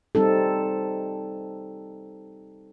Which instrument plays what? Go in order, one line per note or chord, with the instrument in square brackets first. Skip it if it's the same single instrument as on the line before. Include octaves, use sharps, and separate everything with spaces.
[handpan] G3 C4 D#4 A4